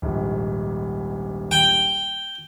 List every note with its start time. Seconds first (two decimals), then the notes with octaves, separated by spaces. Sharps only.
0.02 D#1 A#1 G#2
1.51 G5